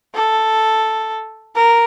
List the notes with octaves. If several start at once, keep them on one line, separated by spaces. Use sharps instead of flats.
A4
A#4